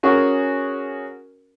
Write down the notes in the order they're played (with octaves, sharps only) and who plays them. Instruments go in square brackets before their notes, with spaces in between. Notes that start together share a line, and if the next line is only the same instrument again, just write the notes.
[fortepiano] C#4 F#4 G#4 A#4